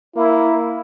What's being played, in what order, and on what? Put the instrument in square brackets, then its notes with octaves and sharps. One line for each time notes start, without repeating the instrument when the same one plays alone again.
[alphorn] A#3 [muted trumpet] E4